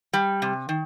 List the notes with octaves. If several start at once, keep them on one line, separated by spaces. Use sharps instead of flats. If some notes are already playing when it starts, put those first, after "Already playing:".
G3
C3
D#3